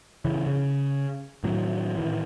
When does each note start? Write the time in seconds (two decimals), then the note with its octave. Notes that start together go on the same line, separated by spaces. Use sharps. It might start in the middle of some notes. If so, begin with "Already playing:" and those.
0.25 C#3 E3 C#4
0.46 C#3
1.44 A2 D#3 F#3
1.97 A2 D#3 E3